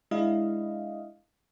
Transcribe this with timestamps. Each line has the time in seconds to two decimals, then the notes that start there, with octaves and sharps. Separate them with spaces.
0.11 G#3 D4 E4 D#5 F5